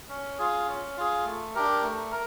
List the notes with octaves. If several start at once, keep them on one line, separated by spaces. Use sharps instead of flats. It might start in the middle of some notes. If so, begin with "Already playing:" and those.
C#4
F4 G#4
C#4
F4 G#4
A3
D4 G4 A#4
A3
A#4